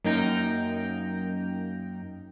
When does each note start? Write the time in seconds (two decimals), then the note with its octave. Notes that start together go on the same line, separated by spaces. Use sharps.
0.04 F#2 A#3 D#4 G5 A#5